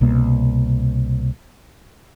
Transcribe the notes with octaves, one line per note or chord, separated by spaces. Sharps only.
C2 B2 A#3